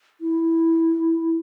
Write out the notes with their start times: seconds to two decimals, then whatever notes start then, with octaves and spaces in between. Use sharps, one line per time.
0.21 E4